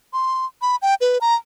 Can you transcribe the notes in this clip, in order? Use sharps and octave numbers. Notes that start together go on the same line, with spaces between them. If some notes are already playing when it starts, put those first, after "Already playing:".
C6
B5
G5
B4
A#5